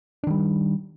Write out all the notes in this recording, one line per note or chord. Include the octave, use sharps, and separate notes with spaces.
D#3 G3 D4